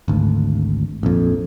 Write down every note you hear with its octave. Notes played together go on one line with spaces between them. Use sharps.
G#1 D2
A#1 F2